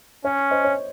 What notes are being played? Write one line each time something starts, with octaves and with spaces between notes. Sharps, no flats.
C#4 C#5
C5 D#5
C#5